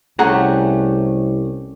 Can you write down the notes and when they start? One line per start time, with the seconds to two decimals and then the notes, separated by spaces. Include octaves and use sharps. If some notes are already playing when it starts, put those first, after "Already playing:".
0.19 C2 A3 C#4 G4 G#4 F#5 A#5